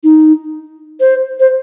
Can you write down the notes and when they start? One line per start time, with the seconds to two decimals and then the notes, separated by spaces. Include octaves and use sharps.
0.03 D#4
1.00 C5
1.40 C5